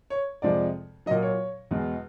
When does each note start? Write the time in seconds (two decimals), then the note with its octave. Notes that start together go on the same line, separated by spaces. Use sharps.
0.10 C#5
0.42 F2 C3 F3 G#3 D5
1.06 F#3 D#5
1.11 A#2
1.22 C#5
1.71 E2 B2 G#3